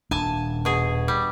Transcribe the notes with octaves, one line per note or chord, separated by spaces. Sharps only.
D#1 D4 G#5 A5
B2 G#4
G3